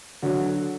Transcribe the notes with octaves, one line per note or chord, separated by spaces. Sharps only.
D3 F#3